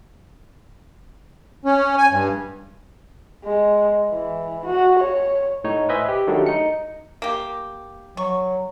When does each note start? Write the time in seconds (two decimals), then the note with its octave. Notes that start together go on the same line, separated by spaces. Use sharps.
1.65 C#4
1.98 G#5
2.10 G2
3.45 G#3
4.10 E3
4.65 F#4
4.99 C#5
5.64 A2 D#4 C#5
5.89 B4 C5 D#5 E5 G#5
6.08 G4
6.27 D#3 F#3 G3 A3 D4
6.46 D#4 C#7
7.22 A#3 G4
8.17 F#3 C#6